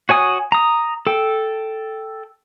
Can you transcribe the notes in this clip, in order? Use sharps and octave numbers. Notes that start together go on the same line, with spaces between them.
F#4 C#5 G#5 D#6
A#5 D#6
A4 G5